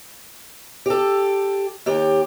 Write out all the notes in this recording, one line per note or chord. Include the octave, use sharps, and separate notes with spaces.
G4 A4
D#2 G4